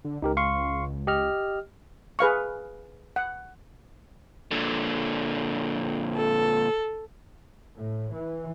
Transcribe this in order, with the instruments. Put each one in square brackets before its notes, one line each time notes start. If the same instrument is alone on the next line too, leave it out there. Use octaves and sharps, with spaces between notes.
[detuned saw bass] D3
[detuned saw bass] C#2 [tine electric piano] D#4 G4 A#4
[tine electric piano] F5 C6 C#6
G4 D#5 F6
[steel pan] G#4 B4 F5 C#6
F#5
[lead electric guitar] A#2 D3
[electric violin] A4
[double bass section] A2
E3